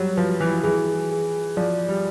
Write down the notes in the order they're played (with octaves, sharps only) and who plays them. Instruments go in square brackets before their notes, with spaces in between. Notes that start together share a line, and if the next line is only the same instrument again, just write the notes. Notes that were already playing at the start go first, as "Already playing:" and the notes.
Already playing: [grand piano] F#3 G3
[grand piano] F3 [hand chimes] B4
[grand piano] E3
[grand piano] E3 [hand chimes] G#4
[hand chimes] G#4
[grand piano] F3 [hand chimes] D5
[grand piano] G3